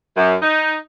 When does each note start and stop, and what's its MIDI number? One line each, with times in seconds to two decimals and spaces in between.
0.16 0.36 42
0.42 0.74 63